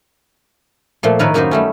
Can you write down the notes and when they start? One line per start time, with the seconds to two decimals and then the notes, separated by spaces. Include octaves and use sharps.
1.03 A#2 F3 A3
1.19 A2 D#3 A#4 B4 C#5 E5
1.34 F#2 A#3 D#4 F#4 B4 C5
1.51 G3 A3 C#4